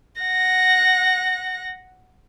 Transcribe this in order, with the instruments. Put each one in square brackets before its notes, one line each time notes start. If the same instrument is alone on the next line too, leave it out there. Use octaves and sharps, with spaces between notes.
[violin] F#5 A#6